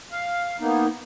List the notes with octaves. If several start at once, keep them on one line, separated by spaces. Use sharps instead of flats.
F5
A#3 B3 D#4